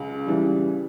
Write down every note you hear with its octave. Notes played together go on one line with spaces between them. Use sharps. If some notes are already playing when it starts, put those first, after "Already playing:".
Already playing: C#2
C#3 E3 G3